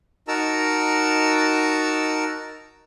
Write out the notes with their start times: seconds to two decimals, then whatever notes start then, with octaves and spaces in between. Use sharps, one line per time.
0.28 D#4 F#4 A#4 A5 A#5 E6